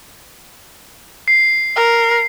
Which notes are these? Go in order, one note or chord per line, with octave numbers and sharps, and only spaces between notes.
C7
A#4